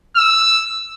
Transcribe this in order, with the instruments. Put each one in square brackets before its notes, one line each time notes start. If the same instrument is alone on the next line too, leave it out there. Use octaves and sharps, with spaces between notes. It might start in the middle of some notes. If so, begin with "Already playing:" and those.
[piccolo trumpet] E6